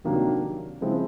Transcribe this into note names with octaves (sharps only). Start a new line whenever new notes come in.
C3 D#3 F#3 A#3 D4
C#3 F3 G#3 C4 E4